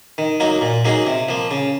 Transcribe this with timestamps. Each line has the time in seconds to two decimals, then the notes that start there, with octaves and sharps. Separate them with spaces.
0.18 D#3
0.40 F#3 A#3 D#4
0.61 A#2
0.85 F#3 A#3 D#4 G#4
1.06 C3
1.28 F3 A#3
1.51 C#3